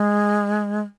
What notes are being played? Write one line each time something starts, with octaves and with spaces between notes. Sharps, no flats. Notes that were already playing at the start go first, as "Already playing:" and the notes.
Already playing: G#3